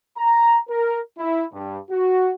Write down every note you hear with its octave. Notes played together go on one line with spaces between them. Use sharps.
A#5
A#4
E4
G2
F#4